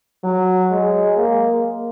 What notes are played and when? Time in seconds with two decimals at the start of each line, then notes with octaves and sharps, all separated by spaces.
0.24 F#3
0.71 G#3
1.17 A#3